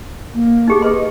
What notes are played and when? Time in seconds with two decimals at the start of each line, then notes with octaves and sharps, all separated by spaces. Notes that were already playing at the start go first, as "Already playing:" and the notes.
0.34 A#3
0.68 D#4 G4 G#4
0.82 G#4 B4 D#5 C6